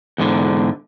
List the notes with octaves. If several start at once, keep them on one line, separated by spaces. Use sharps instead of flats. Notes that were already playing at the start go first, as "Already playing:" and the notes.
E2 G#2 D3